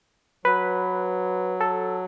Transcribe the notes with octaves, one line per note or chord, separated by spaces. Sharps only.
F#3 B4
A4